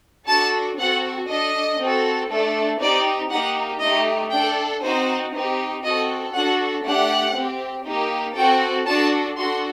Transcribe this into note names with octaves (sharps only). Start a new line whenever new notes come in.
D4 F#4 A4 A5
C4 F#4 A4 F#5
D4 A4 D#5
C4 F#4 A4
A3 D4 A4
C4 D#4 G4 D5
A#3 D#4 G4 F#5
A3 D#4 G4 D#5
D4 A4 G5
C4 D#4 F#4 C5
C4 D#4 G4
C4 F#4 A4 D#5
D4 F#4 A4 F#5
A3 D4 G4 F#5
C4 G4
A#3 D#4 G4
C4 F#4 A4 G5
D4 F#4 A4 A5
D4 F#4 A4 C6